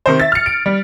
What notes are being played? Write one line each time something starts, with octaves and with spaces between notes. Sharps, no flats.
C3 D#3 C5
E5 A6
F6 C#7
D7
G3